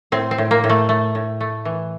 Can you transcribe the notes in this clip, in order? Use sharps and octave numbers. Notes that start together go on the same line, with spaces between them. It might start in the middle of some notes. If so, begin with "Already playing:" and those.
A2 C4
C4
A2
A#3
A2
A3
A3
A2
A3
E3